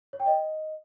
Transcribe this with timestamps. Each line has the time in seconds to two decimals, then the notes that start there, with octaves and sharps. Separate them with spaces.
0.13 C#5
0.20 G5
0.26 D#5